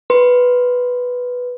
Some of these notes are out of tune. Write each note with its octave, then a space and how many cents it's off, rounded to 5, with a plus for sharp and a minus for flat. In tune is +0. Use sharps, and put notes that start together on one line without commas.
B4 +0 C6 -5